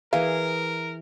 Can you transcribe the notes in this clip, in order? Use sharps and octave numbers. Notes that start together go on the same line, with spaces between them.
E3 G#4 A#4 F5